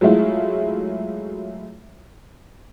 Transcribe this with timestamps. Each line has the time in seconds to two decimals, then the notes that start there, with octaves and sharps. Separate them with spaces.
0.01 F#3 G#3 A3 E4 F4